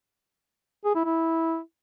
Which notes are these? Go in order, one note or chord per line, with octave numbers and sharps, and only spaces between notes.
G#4
E4
E4